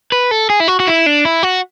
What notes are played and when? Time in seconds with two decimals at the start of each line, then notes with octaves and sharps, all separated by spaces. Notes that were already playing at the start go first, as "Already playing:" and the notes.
0.12 B4
0.31 A4
0.50 G#4
0.60 E4
0.68 F#4
0.80 F#4
0.87 E4
1.06 D4
1.25 E4
1.43 F#4